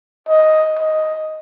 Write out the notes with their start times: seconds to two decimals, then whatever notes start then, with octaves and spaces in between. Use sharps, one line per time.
0.29 D#5
0.79 D#5